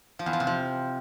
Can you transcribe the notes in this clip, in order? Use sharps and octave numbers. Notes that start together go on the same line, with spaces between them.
F3
E2
F3
C3
F3